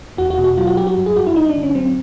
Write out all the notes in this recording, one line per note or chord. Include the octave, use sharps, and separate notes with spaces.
E2 F#4
F#4
B2
F#4
F#3 F4
F#4
F#3 G4
F#4
G2
G#4
G2 F#4
E4
G2 D#4
D4
D3
C#4
F#3 C4